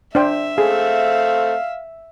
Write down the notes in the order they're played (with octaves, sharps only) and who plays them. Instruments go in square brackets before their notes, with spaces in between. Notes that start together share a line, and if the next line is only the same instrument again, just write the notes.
[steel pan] D4 C5 G5 [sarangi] E5
[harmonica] A3 C4 [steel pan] G#4 [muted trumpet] F5